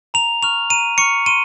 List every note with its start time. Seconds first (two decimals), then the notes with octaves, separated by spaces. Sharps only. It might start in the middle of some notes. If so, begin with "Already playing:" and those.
0.14 A#5 F7
0.43 C#6 F6 F7
0.70 A#5 D#7
0.98 C#6 F6 C#7
1.26 C6 D#7